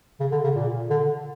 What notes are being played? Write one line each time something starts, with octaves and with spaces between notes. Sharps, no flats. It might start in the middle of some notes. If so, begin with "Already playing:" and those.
C#3
D3
C#3
A#2
D3